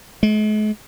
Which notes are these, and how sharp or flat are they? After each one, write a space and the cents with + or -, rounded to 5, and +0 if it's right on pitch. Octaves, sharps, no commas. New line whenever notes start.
G#3 +45